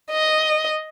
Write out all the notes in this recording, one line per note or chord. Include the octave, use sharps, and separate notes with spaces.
D#5